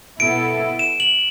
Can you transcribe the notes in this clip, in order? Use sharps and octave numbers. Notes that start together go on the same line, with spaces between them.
B2 B3 E4 A4 D7
E7
F#7